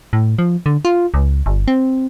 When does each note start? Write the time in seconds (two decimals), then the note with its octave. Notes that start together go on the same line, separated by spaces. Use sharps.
0.13 A2
0.38 F3
0.66 D3
0.85 F4
1.14 C#2
1.46 G1
1.68 C4